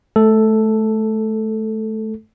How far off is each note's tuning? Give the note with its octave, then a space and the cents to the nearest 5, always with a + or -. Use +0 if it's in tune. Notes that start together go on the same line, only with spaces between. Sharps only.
A3 -25 A4 +0